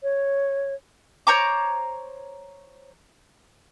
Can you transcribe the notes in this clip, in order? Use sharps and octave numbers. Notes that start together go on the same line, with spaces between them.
C#5
C5 C#5 A#5 D6